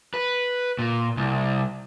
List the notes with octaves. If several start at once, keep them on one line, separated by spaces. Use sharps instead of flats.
B4
A#2
C2